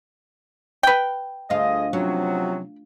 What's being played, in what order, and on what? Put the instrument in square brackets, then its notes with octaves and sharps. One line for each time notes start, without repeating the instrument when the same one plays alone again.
[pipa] B4 G5
[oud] D2 F4 [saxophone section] A3 G#4 D#5
[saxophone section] C3 F3 F#3 [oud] C#4